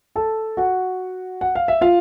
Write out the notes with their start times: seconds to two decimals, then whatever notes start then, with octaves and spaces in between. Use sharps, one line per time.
0.16 A4 A5
0.57 F#4 F#5
1.41 F#5
1.55 F5
1.68 E5
1.81 F4 F5